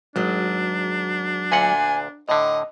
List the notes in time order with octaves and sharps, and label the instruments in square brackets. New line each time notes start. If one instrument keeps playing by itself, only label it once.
[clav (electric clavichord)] G#1 [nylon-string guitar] F#3 G#3 [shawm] D4
[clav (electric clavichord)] D2 A#2 F#5 [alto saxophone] G#5
[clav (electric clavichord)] A2 D3 [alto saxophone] D#5